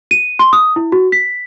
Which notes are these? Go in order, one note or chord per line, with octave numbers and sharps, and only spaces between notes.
D#7
C6
D#6
E4
F#4
B6